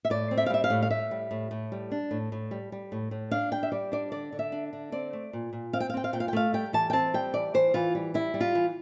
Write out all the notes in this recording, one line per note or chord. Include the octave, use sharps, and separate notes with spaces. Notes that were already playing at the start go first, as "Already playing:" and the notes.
E5
A2 D5
C4
E5
F5
G3 E5
F5
A2
F5
A2 E5
G3
A2
A2
G3
D4
A2
A2
G3
G3
A2
A2
D4 F5
G3 G5
E5
G3 D5
D4 D5
D3 D5
D3
E5
D4
D3
C4 D5
A3
A#2
A#2
C4 F5
G5
F5
C4 G5
F5
A#2 G5
F5
G5
A3 F5
G3 G5
E3 A5
G5
C4 A5
G3 G5
E3 D5
E3 C5
E3 F4
G3
G3 E4
G3
F4
E3